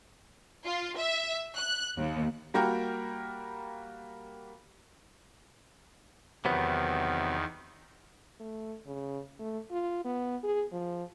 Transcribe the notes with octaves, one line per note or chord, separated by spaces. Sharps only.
F4
E5
F#6
D#2
G3 A#3 F#4 A#4 G5
E2 C3 D#3 F#3 B3
A3
C#3
A3
F4
B3
G#4
F3